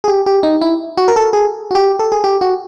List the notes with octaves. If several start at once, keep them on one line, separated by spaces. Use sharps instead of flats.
G#4
G4
G4
D#4
E4
F#4
A#4
A4
G#4
F#4
G4
A4
G#4
G4
F#4